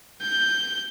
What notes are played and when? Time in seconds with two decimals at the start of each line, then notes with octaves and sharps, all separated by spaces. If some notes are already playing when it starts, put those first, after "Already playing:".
0.21 G6